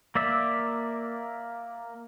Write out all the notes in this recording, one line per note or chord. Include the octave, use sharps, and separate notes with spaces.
A#3 D5 E5